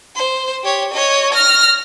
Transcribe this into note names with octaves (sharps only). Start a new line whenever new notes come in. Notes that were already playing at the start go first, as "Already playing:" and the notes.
C5
G4 C#5
C#5 D#5
F6 A#6